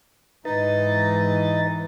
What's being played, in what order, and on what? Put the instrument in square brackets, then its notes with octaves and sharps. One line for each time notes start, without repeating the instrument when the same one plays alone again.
[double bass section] G#2 E3 [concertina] D#4 [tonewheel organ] B4 D#5 A6